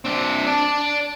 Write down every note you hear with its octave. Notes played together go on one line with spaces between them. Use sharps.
C4 D4
D5 A5